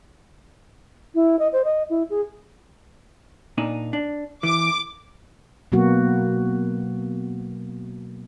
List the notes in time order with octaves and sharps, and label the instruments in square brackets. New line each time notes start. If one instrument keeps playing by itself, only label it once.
[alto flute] E4
D#5
C5
D#5
E4
G#4
[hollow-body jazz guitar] A#2 D4 D#4
D4
[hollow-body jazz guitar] E3 [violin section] D6
[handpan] B2 F#3 A#3 B3 F#4